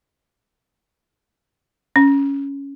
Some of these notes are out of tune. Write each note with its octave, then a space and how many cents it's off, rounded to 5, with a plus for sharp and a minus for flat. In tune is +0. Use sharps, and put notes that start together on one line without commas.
C#4 +5